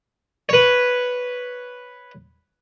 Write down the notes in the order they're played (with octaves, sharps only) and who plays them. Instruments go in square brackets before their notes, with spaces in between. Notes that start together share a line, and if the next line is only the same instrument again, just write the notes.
[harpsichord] B4 C#5